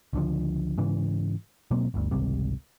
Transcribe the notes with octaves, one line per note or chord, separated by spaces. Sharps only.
C#2 D3 F3
G#2 C#3 E3
B2 F#3 A#3 C4
G1 D2
G#1 C#2 C3 G3